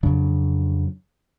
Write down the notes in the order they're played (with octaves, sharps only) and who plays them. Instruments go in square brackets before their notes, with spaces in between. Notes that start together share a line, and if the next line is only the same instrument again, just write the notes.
[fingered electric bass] F2 C#3 F#3 D4